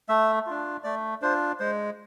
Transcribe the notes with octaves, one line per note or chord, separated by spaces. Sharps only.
A3 E5
D4 F4
A3 D5
D4 F4 C5
G#3 C5